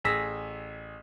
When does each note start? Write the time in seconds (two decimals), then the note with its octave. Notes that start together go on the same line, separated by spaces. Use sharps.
0.04 A1 G#4 E6 A#6 B6